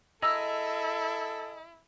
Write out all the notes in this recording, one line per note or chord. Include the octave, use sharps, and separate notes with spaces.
E4 G#4 A4 D#5 A#5 E6